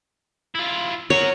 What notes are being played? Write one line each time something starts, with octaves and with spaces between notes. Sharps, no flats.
E4 F4
F#4 A#4 C#5